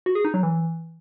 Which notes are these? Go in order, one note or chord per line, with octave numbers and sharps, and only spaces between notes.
F#4
G#4
D#4
F#3
E3